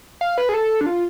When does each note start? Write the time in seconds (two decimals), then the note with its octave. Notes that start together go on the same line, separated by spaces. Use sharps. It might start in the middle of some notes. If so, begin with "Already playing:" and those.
0.21 F5
0.38 B4
0.49 G#4
0.54 A4
0.81 D4
0.86 F4